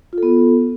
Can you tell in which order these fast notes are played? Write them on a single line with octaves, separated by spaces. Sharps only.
F4 A4 B3